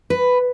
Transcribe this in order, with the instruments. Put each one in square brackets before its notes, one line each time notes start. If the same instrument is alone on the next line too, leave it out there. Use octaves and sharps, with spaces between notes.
[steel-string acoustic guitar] B4